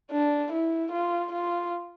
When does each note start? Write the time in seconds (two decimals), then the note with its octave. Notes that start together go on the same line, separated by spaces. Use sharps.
0.11 D4
0.52 E4
0.92 F4
1.32 F4